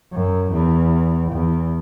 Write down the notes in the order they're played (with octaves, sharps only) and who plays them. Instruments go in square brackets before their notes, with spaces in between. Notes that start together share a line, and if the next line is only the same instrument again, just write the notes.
[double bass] F#2
E2
E2